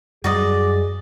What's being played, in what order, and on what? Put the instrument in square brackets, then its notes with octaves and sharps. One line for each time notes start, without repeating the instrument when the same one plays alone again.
[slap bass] F#2 G3 G#3 [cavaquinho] F#4 D5 D#5 [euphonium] G#4